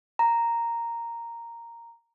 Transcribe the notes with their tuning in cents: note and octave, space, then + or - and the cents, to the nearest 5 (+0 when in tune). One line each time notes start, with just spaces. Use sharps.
A#5 -5